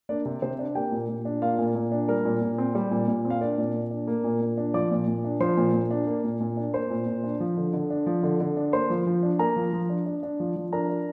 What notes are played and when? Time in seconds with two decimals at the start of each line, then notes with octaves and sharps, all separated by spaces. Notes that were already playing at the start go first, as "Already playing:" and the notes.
0.09 A#3 D4 D5
0.25 C3
0.42 C3 C4 C5
0.59 D4
0.75 A#3 G4 G5
0.92 A#2
1.09 A#2
1.25 D4
1.42 A#3 F4 F5
1.58 A#2
1.75 A#2
1.92 D4
2.08 G3 A#4
2.25 A#2
2.42 A#2
2.58 C4
2.75 G3
2.91 A#2
3.08 A#2
3.25 C4
3.30 F5
3.41 A#3 D4 D5
3.58 A#2
3.74 A#2
3.91 D4
4.07 A#3
4.24 A#2
4.41 A#2
4.57 D4
4.74 F3 D5 D6
4.91 A#2
5.07 A#2
5.24 D4
5.40 F3 C5 C6
5.57 A#2
5.74 A#2
5.91 D4
6.07 A#3
6.24 A#2
6.40 A#2
6.57 D4
6.74 A#3 C5 C6
6.90 A#2
7.07 A#2
7.24 D4
7.40 F3
7.57 D3
7.74 D3
7.90 D4
8.06 F3
8.23 D3
8.40 D3
8.57 D4
8.73 A#3 C5 C6
8.90 F3
9.06 F3
9.23 D4
9.39 A#3 A#4 A#5
9.56 F3
9.73 F3
9.90 D4
10.06 D4
10.23 D4
10.40 F3
10.56 F3
10.73 D4 A#4 A#5
10.89 D4